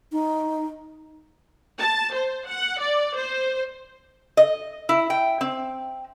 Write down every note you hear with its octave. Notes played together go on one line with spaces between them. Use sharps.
D#4
A5
C5
F#5
D5
C5
D#5
E4
G5
C4